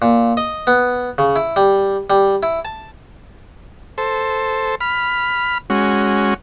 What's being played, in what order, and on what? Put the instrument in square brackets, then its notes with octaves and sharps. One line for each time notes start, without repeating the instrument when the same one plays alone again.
[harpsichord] A#2
D#5
B3
C#3
E4
G3
G3
E4
A5
[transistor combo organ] A4 C5
B5 F6
G#3 C#4 F#4